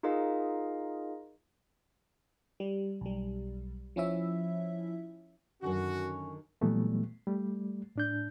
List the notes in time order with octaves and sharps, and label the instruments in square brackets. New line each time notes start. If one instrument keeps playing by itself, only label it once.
[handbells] D#4 F4 G#4 A#4 D#5 F5
[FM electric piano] G3
B1 G3
F3 C#4 E4 E5
[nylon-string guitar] F#2 D3 D#3 [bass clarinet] C#4 [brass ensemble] F#4
[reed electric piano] A#2 E3 F#3 G3 A3 B3
G3 A3
A2 D4 G6